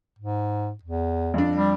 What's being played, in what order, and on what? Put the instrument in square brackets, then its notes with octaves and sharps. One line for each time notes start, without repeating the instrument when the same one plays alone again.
[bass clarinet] G#2
E2
[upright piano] F2 D4
[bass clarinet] G3